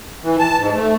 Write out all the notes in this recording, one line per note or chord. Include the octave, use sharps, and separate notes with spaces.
E3
A5
G#2
A3